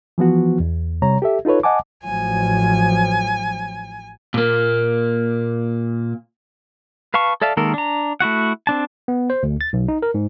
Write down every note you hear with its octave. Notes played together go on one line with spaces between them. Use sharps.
E3 F3 B3 F#4
E2
C3 G3 C#5 A#5
G4 A4 E5
D#4 F4 A4 B4 C#5
D#5 F#5 G#5 A5 D6
A1 F3 F#3 G#5
A#2 A#3
B4 F5 A5 C#6
A4 D5 E5 F5 A5
D#3 G#3 A#3 A4 A#4
D4 A#5
A3 E4 F#4 F#5
C4 D4 A5
B3
C5
D2
A6
B1
D#4
A#4
G#2